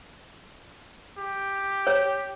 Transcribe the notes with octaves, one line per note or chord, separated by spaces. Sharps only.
G4
C#5